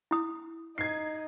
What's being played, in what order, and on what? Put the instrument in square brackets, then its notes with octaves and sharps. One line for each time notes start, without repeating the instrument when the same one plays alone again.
[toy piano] E4 D#6
[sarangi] D#4 [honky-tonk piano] G#6 C7